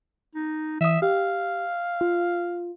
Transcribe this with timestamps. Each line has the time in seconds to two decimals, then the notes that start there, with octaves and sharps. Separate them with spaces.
0.35 D#4
0.81 E3 E5 D#6
1.02 G4 F5
2.01 F4